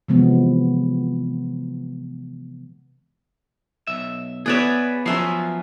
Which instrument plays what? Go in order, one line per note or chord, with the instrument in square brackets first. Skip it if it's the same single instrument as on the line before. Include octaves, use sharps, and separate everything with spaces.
[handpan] C3 E3 F3 G#3 B3
[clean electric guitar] B1 E5
[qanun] B3 B4 C#5 [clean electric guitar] G#4 D5 E5
[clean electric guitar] F3 F#3 B3 [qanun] C#4 E5 C6